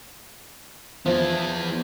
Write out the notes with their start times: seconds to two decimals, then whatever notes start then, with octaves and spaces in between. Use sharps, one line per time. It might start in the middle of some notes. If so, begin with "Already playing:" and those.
1.06 F3 B3 E4